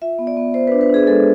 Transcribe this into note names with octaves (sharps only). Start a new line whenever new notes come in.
F4 E5
B3
D5
B3
B3 C5
D4 B4
B4
D4 G#4
G#3 A4